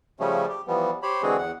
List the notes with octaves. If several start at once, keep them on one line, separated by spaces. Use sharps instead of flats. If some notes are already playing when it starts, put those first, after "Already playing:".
C#3 F3 G3 A3 C#4
G4
E3 F3 G3 B3
G4 C5 C#5 B5
D3 E3 G#3 C4 F#4 G#4
E2 F#5